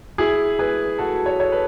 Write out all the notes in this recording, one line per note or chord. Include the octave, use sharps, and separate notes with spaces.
E4 G#4
G#4 B4
F#4 A4
C#5
A4 C#5
B4